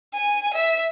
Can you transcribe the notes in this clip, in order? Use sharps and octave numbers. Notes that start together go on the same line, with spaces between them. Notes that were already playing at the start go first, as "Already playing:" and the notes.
G#5
E5